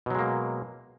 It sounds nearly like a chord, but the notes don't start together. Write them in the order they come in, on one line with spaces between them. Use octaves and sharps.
B2 F#3 G#3 A#3